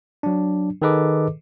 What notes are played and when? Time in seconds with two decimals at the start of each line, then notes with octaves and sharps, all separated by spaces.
0.23 F#3 D4
0.82 D#3 G#4 A4 B4 D#5 D6